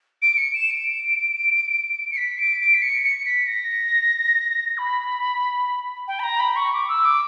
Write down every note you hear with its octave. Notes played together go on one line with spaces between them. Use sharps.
D7
C#7
E7
D7
C#7
B6
D7
D7
B6
C#7
C#7
B6
A#6
B5
G5
B5
A#5
B5
C#6
D6
E6
D6